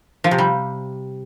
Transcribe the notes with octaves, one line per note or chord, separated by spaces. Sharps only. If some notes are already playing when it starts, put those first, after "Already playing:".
F3
C3
G3